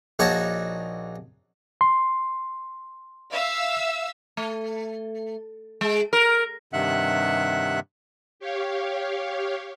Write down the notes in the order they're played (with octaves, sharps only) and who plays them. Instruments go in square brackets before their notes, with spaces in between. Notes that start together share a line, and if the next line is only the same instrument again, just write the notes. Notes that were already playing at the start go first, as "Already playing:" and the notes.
[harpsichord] A#1 D#4 F#4 C#5 A5
[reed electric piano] C6
[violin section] E5 F5 E6
[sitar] A3
G#3
A#4
[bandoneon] G2 C3 D#3 E5 F#5 F#6
[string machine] G4 C#5 F5